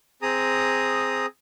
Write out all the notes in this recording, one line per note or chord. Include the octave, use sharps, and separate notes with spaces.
C4 G#4 A#5 D#6